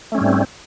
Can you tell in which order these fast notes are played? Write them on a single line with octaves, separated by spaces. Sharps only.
A3 C#4 G3 G#2 C4